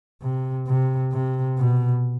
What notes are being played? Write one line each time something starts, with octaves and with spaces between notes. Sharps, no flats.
C3
C3
C3
B2